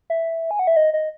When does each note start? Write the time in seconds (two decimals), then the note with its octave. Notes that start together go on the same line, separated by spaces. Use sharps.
0.10 E5
0.51 G#5
0.59 F#5
0.67 E5
0.76 D#5
0.93 D#5